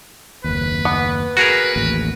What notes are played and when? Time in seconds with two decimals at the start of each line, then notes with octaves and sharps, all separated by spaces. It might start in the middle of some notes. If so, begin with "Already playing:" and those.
0.44 F#1 D#2 B4
0.85 B3
1.37 F#4 G#4 A#4 B4
1.76 A1 D#2